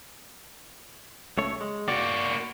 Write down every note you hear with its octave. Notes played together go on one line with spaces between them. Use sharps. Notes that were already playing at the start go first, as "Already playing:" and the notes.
C#2 A3 C#5
G#3
A#3 F#4 D5